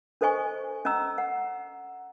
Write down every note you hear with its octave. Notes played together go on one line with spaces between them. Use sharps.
D4 A4 C5 D#5 G#5 C#6
C#4 D#5 A#5 E6
F#5